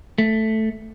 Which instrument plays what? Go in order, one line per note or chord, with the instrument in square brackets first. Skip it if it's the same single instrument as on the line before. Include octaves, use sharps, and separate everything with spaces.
[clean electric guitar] A3